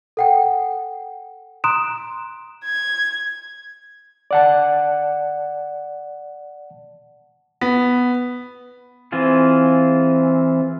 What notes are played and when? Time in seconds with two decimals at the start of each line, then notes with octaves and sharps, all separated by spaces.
0.17 A4 F#5 G5
1.64 A#5 C6 D#6 F#6 D7 E7
2.64 G#6
4.31 D5 F#5 A5
7.61 B3
9.12 E3 C4 F4 G#4